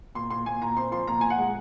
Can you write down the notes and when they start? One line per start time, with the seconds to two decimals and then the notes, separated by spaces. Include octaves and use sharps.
0.15 A#2 C6
0.30 A#2 C6
0.46 A#2 G#5
0.62 A#2 A#5
0.76 C4 C6
0.92 F3 C6
1.07 A#2 A#5
1.21 A#2 G#5
1.30 F#5
1.38 G#3